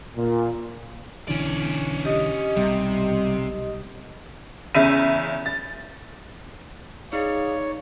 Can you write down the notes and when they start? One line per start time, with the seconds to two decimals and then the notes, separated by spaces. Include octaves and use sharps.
0.16 A#2
1.28 B1 D3 E3 C#4 D5
2.05 G4 D#5 D#6
2.57 B1 C3 G3
4.75 E2 C#3 E5 D#7
5.46 A6
7.12 D#4 G#4 C#5 D5 F5 C#7